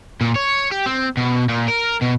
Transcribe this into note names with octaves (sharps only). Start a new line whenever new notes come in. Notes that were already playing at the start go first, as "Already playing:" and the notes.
A#2
C#5
G4
C4
B2
A#2
A#4
B2